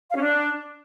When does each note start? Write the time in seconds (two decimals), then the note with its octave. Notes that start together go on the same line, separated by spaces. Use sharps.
0.11 F5
0.16 C#4
0.22 D4